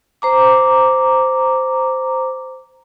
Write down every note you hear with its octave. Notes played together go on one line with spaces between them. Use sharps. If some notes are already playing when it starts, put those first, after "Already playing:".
C5 A#5 D6